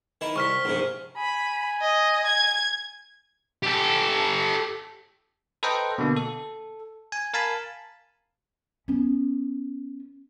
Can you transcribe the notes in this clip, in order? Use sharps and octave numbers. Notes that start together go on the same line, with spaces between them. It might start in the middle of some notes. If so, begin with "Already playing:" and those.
D#3 E4
C2 C#6 F6 B6
A#1 G#2 C3
G#5 B5
D#5
G#6
G4 A4
A4 B4 C5 D#5 G5 A#5
B2 D3 A#3
A4
G#5
A#4 F5 G#5 A5 B5
B3 C#4